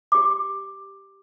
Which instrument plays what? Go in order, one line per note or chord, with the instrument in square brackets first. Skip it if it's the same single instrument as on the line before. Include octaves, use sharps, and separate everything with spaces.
[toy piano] G4 D6